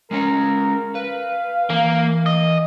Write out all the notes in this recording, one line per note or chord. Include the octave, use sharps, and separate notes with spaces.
G#3 C#4 A#4 C#5
B4 F5
E3 A#3
D#5